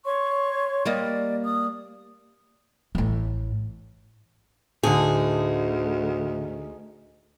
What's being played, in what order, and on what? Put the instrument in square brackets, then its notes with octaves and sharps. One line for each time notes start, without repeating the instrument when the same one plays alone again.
[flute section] C#5 C6 C#6
[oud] G3 A#3 D#5 [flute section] D5
[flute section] D#6
[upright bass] A1 A2
[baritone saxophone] D2 [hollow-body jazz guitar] A2 D3 [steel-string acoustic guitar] D#4 G#4